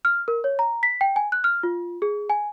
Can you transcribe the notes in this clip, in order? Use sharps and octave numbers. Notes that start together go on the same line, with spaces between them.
F6
A#4
C#5
A#5
B6
G5
G#5
F#6
F6
F4
G#4
G#5